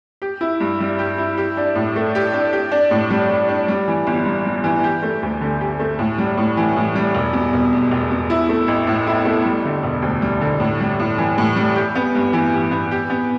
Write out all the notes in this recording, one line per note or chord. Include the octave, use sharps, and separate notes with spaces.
G4
E4
G2
G3
G4
E4
G4
D4
A2
A3
G4
D4
G4
D4
A2
G3
G4
D4
G3
E3
G1
G2
G3
E3
G4
A3
D2
D3
G4
A3
A2
G3
A2
E3
A2
G3
E1
B2
E1
E2
E1
B2
E4
A3
A1
A2
E4
A3
G3
D3
E1
D2
G3
D3
A2
G3
A2
E3
A2
G3
G4
B3
G2
E3
G4
B3
G4
B3